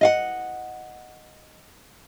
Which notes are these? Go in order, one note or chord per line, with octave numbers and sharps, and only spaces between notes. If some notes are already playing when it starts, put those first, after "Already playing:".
D#5 F5 F#5